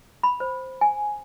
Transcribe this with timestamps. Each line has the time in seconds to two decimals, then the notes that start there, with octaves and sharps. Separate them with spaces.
0.23 B5
0.40 C5
0.81 G#5